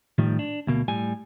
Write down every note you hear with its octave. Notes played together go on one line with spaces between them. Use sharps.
A2 D#3 F3 G3
D4
D2 B2 A#3
A2 G3 G#5